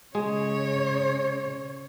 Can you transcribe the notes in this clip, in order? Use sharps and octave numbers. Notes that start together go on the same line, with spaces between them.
C#3 G#3 G#4 C#5